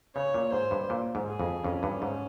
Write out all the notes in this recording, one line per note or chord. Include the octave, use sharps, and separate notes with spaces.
C#3 C#5
A#2
G#2 C5
G2
A#2
G#2
G#4
F2
F2 C#4
G2
G#2